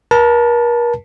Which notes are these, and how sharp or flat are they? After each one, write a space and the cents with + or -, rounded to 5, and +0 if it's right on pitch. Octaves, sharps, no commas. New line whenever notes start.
A#4 +40 A5 +0